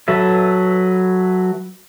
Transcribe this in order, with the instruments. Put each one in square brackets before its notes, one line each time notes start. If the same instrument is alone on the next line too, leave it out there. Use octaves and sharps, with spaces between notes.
[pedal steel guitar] F#3 A4 B4 E5